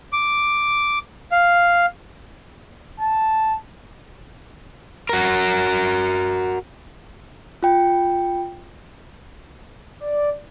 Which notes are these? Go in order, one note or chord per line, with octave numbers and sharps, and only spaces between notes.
D6
F5
A5
F#4 A#4
F4 G5
D5